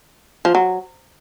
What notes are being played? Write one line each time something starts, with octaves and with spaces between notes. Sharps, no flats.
F3
F#3